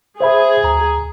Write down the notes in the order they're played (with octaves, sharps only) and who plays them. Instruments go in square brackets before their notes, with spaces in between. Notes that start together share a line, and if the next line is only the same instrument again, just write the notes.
[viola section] G#4 [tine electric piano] C5 E5 B5
[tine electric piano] D2 A#5